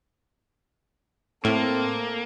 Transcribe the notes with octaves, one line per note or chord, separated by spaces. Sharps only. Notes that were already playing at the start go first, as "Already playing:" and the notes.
A2 A#3 C4 A4